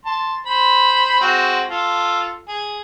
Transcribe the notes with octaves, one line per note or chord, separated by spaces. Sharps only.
A5 C6
C5 B5
G#3 C4 F#4
F4 A4
G#4